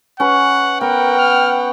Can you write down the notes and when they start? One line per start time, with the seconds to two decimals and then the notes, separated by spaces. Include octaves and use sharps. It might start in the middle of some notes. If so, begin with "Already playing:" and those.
0.20 C#4 B4 F#5
0.81 B3 A#4 F#5 G5
1.18 F6